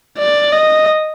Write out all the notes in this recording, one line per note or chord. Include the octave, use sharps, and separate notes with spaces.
D5
D#5